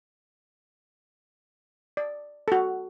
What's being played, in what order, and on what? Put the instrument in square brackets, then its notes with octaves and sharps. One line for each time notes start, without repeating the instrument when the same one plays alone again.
[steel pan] D5
F#4 A4